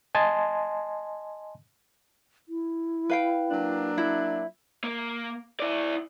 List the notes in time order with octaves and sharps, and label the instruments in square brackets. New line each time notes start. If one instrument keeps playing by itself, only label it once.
[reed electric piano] D#5 G#5 A5 C6
[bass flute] E4
[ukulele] B4 F5 G5
[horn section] F#3 A#3 D4
[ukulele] E4
[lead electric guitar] A#3
E4 D5